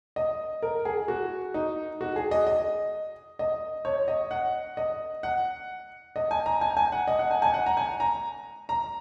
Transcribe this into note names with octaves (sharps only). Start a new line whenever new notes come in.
D#5
A#4
G#4
F#4
D#4
F#4
G#4
D#5
D#5
D#5
C#5
D#5
F#5
D#5
F#5
D#5
G#5
A#5
G#5
G#5
F#5
D#5
F#5
G#5
G#5
F#5
A#5
G#5
A#5
A#5